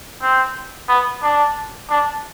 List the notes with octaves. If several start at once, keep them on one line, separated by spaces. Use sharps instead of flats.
C4
B3
D4
D4